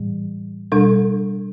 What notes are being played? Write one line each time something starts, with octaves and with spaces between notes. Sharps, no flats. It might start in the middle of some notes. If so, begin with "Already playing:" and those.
Already playing: A2 E3 G3
B2 G3 D4 A4